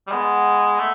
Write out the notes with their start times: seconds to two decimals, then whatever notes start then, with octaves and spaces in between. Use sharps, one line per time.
0.07 G3
0.12 G#3 B3
0.79 A3